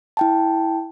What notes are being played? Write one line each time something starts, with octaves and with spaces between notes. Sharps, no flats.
E4 G5 A5